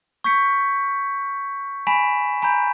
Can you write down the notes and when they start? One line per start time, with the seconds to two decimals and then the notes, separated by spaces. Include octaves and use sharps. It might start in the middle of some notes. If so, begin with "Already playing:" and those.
0.24 C#6 G6 B6 C#7
1.87 G#5 B5 B6 E7
2.42 G#5 A#5 B5 G6